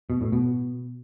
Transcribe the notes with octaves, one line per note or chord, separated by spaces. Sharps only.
B2
A2
B2